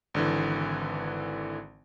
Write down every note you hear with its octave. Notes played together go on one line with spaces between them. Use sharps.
G#1 D3 E3